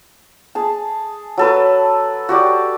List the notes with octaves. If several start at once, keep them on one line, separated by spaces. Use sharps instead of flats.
G#4 A5
F#3 A4 B4
F#4 G4 D5